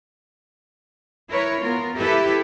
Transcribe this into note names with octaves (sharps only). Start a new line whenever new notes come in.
E4 A#4 B4 C#5
B3 F4 A#4
E4 G4 A4 B4 E5